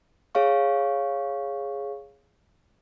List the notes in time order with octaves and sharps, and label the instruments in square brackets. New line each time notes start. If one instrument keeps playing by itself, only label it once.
[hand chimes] G#4 C#5 F5 C#6